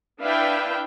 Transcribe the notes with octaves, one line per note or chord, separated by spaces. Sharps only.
D4 E4 B4 E5 F5 G5